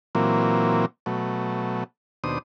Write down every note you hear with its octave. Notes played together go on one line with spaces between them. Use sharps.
A#2 E3 F#3 A#3 C4
B2 F#3 A3
D#2 B2 D4 C5 D#6